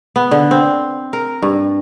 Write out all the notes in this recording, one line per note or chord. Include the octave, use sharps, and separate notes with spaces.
B3
D3
C4
A#4
G2